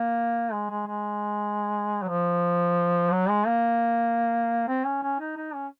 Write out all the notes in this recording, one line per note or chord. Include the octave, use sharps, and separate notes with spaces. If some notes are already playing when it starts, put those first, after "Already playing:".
Already playing: A#3
G#3
G#3
G#3
F#3
F3
F#3
G#3
A#3
C4
C#4
C#4
D#4
D#4
C#4